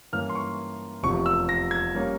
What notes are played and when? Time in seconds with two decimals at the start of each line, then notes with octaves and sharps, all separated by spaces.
0.12 G2 E3 A#3 C#4 F6
0.30 C6
0.35 C#6
1.03 F1 E2 C3 F3 C#6
1.26 E6
1.49 A#6
1.71 G#6
1.95 G3 A#3 C#4